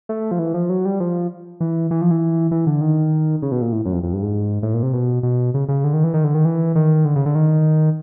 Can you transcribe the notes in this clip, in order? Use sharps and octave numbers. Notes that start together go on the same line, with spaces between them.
A3
F3
E3
F3
F#3
G3
F3
E3
E3
F3
E3
E3
D3
D#3
C#3
B2
A#2
A2
F#2
F2
F2
G2
G#2
A2
A#2
C3
B2
B2
C#3
C#3
D3
D#3
E3
D#3
D3
D#3
E3
D#3
D3
C#3
D3
D#3